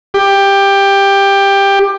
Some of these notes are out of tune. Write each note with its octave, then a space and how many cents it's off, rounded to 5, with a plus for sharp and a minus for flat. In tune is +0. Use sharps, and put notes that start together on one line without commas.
G4 +15